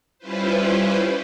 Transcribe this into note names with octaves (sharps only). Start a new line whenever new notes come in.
G3 C#4 E4 F4 B4 C5